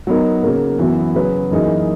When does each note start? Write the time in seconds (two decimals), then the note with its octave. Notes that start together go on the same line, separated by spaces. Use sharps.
0.07 F#3 B3 D#4 A#4
0.43 C#3 F#3 A#3
0.79 F#2 E3 B3 F#4
1.15 C#3 F#3 C#4 G#4 B4
1.51 F#2 E3 A#3 D#4 G#4